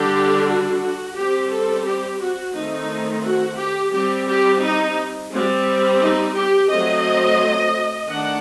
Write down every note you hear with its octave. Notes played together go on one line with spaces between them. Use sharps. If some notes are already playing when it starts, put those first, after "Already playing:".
Already playing: D3 G3 D4 G4
F#4
G3 C4 G4
A4
G4
F#4
D#3 A3 C4 D#4
F#4
G4
G3 C4 G4
G4
D#4
G3 C4
D#4
G4
F#3 A3 C4 D#5
D#3 A3 D4 F#5